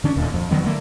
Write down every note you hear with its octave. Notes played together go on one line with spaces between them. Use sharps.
D3 C#4 D4
D1 D#2 A#2 D3
F2
D3 D#3 F#3 B3
D3 A3 A#3